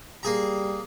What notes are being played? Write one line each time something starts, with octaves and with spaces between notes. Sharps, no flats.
G3 A#3 G#4 A#5